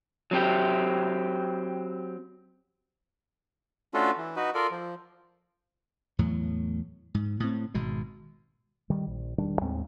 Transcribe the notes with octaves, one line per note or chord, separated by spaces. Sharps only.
F#3 C4 G4
A3 C#4 D4 F4 F#4 A4
E3
D#4 F#4 B4
F4 A4 A#4 D5
F3
E2 A2 F#3
G#2
A2 C4
G#1 B2 G#3
D#3 G3
A#1
E1 D#3 G3 D4
D#2 A2 G#3 C4